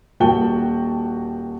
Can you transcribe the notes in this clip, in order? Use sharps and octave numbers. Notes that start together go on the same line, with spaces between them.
D#1 A#3 F#4 G5 A5 G7